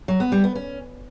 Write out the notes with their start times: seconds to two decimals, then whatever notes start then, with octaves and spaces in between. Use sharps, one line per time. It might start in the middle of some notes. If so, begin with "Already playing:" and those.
0.08 F#3
0.20 B3
0.32 G3
0.44 B3
0.55 C#4